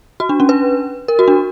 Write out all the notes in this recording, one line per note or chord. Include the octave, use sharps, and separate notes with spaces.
F#4
D4
C#4
B4
A#4
F#4
D4